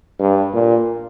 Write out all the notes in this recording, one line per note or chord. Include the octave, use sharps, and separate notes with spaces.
G2
A#2